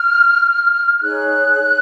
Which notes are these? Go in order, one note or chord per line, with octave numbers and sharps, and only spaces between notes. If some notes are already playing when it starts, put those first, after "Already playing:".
Already playing: F6
F6
D#4 G#4 C#5 F#6